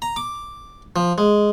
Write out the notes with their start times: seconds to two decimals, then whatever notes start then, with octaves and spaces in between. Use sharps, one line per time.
0.02 A#5
0.16 D6
0.96 F3
1.18 G#3